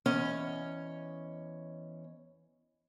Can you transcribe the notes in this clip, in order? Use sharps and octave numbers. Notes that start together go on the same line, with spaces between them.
E2 C#4 C#5 D#5